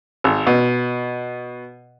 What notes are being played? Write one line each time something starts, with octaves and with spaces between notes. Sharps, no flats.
G#1
B2